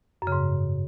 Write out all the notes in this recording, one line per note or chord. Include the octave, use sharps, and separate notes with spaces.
F#2
C#3
G#2